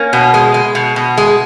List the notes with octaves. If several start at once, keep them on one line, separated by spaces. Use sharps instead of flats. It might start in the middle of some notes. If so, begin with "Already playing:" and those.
Already playing: A#3 C#4
B2
G#3
G#3
B2
B2
G#3